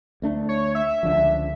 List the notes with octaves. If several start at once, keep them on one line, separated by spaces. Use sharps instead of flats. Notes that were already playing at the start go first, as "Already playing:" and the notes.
D2 A3 D4
C#5
E5
C#2 D3 F3